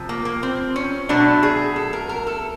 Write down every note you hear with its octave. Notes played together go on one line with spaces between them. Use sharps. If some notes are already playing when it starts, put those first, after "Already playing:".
Already playing: C3 F3
A#3
A#3
C4
C#4
B2 F#3 A3 D4
G#4
A4
A#4
A#4
A4